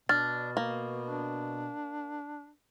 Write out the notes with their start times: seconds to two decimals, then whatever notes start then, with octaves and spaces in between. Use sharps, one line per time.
0.09 B2 D4 F6 A6
0.57 A#3
1.06 D4